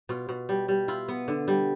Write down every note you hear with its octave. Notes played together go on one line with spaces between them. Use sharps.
B2 F4
B2
G3
G3
E4 F4
B3
D3
G3